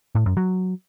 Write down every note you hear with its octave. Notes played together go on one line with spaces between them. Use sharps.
A2
F#2
F#3